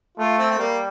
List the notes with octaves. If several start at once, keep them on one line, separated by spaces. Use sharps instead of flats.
A3 F4
C4
C4
G3 A#3